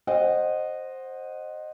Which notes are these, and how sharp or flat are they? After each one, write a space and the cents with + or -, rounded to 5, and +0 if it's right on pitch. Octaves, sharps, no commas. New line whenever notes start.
C5 +10 D#5 -15 F#5 +0